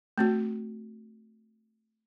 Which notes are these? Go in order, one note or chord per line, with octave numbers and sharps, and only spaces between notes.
A3 C4 F#4